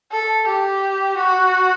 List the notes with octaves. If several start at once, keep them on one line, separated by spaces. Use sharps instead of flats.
A4
G4
F#4